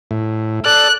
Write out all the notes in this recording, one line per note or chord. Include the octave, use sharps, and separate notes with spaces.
A2
A4 D5 F#6